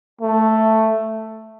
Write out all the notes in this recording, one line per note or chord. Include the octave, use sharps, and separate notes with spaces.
A3